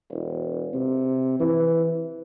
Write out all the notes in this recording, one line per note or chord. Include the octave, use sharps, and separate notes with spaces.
E1
C3
E3